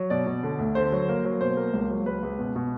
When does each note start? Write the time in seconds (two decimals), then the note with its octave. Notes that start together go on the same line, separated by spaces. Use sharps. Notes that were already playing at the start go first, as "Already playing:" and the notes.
Already playing: F#3
0.10 B2 D5
0.27 B2
0.43 D3
0.59 D2
0.75 D3 C5
0.92 F#3
1.09 A#3
1.25 F#3
1.41 B2 C5
1.57 A#3
1.73 C#2
1.90 F#3
2.06 C#2 B4
2.23 C#2
2.39 B2
2.56 B2